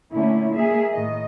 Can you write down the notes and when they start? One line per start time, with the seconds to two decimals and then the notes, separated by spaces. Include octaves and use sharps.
0.14 A#2 D3 A3 C#4 E4
0.55 G#3 A#3 G#4 E5
0.92 A2 D#3 D#5